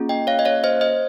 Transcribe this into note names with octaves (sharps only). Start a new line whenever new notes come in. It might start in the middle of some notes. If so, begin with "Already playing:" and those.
Already playing: A#3 C#4 F4 G#4
D#5 G5
C#5 F5
D#5
C#5 F5
C5 D#5
C5 D#5